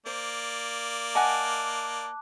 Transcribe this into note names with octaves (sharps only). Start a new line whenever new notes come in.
A#3 C5 D5
D#5 F#5 G#5 A5 D6 F#6